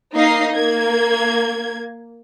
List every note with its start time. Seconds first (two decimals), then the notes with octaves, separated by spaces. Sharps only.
0.14 A#3 D#4 D#5 F5 C7
0.55 A#3 G#6